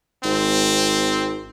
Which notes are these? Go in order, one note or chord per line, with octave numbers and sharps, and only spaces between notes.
G#1 C4